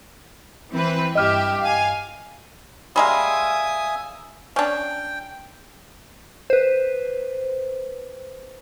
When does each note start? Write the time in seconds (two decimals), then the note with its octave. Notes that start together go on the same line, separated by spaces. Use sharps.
0.72 E3 C4 B4
1.15 G2 G4 D#5 E5 F6
1.62 F5 G#5
2.96 G3 G#3 A#3 E5 G#5 D#6
4.56 C#4 D4 G5
6.50 B4 C5